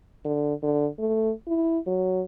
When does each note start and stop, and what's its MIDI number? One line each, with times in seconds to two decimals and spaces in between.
0.25 0.54 50
0.63 0.88 50
0.99 1.32 57
1.47 1.79 64
1.87 2.22 54